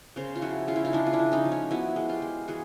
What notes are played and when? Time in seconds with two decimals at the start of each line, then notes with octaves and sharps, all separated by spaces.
0.16 C#3 A#4 C5
0.36 F4
0.41 F3 E4 F#4
0.67 C#3 F4
0.76 E4
0.85 D#4 F4
0.93 G#3 D4 E4
1.06 F4
1.13 D4 E4
1.19 F3
1.32 C#4 D#4
1.45 F3
1.52 C#4
1.71 B3 E4 F#4
1.96 G#3
2.09 F4 G4
2.22 G#3
2.48 E3 F#4 G#4